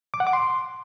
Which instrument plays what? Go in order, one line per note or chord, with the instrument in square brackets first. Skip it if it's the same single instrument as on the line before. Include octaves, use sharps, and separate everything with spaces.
[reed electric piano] D6
F#5
D6
C6